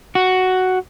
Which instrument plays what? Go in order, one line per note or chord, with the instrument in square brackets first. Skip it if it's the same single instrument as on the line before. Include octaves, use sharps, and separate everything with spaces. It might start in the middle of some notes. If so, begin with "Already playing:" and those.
[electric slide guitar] F#4